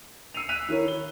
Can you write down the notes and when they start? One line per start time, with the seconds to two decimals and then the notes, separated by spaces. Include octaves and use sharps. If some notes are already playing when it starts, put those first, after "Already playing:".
0.34 E6 C7 C#7 D#7 F7
0.49 F#6 B6 D#7 F7
0.69 D#3 E4 A#4 C#5
0.88 G7